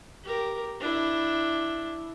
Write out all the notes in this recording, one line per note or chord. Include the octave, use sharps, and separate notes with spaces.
G4 A#4
D4 E4